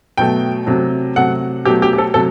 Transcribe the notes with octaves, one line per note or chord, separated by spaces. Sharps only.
B2 F#3 A3 G5
C3 F#3 A3
C3 F#3 A3 F#5
B2 F#3 A3 G4
G4
G4
A4
C3 F#3 A3 A4